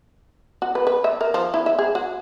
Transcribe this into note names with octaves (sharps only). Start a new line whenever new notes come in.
F#4
B4
B4
E5
A#4
F3
E4
E5
G#4
F#4